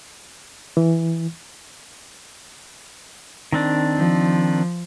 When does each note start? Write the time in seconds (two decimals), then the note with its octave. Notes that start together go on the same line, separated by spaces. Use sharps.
0.77 E3
3.52 D#3 C4 D4
3.96 F3